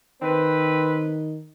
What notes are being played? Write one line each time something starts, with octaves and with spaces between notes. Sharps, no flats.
D#3 C4 B4